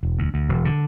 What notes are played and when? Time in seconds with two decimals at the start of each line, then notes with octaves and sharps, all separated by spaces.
0.03 E1
0.19 D2
0.34 D2
0.49 E1
0.65 D3